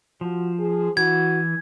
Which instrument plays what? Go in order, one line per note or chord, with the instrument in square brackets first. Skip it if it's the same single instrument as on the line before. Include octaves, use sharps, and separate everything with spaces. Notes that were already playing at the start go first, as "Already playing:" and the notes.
[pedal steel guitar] F3 [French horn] F#4
[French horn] G#4
[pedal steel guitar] E3 [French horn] F#4 [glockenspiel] G#6